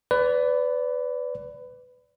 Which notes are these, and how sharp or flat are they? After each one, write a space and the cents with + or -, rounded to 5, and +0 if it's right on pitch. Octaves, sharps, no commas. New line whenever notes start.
B4 +20 D5 -20